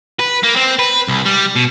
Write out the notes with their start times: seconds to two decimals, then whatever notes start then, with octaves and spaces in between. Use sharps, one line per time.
0.19 B4
0.43 A#3
0.56 C4
0.79 B4
1.08 C2
1.26 G3
1.56 B2